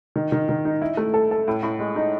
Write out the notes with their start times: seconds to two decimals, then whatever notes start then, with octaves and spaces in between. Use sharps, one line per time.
0.16 D#3
0.32 D#3
0.49 D#3
0.65 D#4
0.82 E4
0.97 A3
1.14 A4
1.31 A4
1.48 A2
1.63 A2
1.79 G#3
1.96 D#4